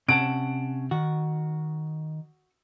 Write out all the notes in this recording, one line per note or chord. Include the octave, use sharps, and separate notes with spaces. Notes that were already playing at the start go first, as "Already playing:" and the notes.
C3 C#4 F#5 A5 D7
D#3 F#4